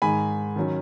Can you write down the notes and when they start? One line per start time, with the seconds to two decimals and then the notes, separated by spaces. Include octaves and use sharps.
0.02 G#2 D#3 G#3 G#5 B5
0.56 D#3 F#3 C#4